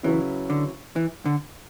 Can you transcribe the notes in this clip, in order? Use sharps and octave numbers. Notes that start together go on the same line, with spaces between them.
C#3 E3 F#3 C#4 E4 B4
D3
E3
D3